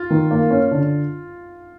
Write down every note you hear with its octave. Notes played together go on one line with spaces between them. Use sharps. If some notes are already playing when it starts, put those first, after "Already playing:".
Already playing: F4
D#3
A#3
C#4
D3